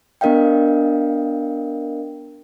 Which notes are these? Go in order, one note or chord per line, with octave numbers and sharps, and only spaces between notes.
B3 D4 A#4 D#5 F5 G5